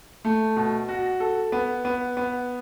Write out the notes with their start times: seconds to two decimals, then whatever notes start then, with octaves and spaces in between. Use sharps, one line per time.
0.25 A3
0.57 B2
0.89 F#4
1.20 A4
1.52 B3
1.85 B3
2.17 B3